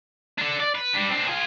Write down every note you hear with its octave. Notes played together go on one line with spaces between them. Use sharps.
D4 A4
D5
B4
G3 D4
C4 D4
F4 G#4